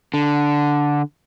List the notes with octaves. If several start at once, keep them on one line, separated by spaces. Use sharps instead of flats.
D3